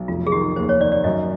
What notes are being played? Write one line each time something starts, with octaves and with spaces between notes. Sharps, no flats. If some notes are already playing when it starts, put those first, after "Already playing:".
Already playing: B1
F1 F4
G#4
D#3 G4
D#2 C5
C#5
D#3 D5
D5
F#2 D#5